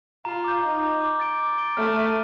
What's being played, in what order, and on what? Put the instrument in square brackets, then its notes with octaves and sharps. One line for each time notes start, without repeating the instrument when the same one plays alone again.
[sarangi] F4 [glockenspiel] A#5
[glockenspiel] D6 G6
[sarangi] D#4 [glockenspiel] A#5
[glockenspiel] D6 G6
D6
A6 D7 G7
D6
A6 D7 G7
[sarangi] A3 [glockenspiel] F6
[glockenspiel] A6 D#7 G7